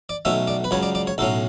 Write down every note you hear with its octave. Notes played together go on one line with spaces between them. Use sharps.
D5
B1 B2 A3 C#4 E5
D5
B4
C#2 C#3 F#3 C#5
D5
D5
C#5
B1 A2 F#3 C#4 A4